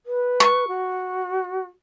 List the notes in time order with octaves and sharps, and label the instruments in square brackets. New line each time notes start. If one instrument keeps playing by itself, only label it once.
[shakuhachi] B4
[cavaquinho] C#6
[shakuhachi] F#4